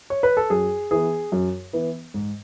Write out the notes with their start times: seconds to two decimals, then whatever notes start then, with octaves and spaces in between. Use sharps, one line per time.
0.10 C#5
0.23 B4
0.37 A4
0.50 F#2 G#4
0.91 E3 B3 G#4
1.32 F#2
1.73 E3 B3
2.14 G#2